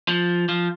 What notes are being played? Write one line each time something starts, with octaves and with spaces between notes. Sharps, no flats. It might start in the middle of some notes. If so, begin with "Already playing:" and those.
F3
F3